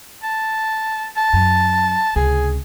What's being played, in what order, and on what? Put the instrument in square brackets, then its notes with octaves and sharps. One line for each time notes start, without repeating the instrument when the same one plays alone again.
[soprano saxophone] A5
A5
[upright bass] F#2
[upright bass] C#2 C3 [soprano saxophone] G#4